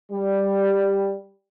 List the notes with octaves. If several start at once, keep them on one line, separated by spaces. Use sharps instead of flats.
G3